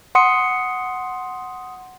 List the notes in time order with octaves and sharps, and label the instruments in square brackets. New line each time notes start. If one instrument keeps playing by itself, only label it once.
[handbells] F#5 C6 D#6 C#7